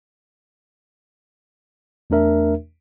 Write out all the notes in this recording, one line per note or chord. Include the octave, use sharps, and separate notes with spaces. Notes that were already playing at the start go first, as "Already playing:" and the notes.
E2 A3 D4 A#4 E5